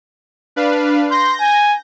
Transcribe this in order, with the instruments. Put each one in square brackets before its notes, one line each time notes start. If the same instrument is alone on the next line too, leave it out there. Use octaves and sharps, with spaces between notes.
[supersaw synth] D4 B4 F5
[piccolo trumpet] C6 [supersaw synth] G6 A#6
[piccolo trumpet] G#5